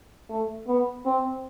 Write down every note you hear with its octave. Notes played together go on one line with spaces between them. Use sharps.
A3
B3
C4